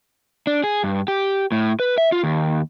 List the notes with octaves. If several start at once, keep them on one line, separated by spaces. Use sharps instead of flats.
D4
G#4
G2
G4
A2
B4
E5
F4
D#2